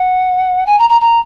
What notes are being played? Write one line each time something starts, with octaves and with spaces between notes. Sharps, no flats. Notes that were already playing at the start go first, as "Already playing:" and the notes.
Already playing: F#5
G#5
A#5
A#5
A#5